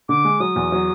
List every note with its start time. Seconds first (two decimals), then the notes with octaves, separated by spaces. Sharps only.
0.09 D3 D6
0.24 G#3
0.40 F#3 D#6
0.56 E2
0.72 F#3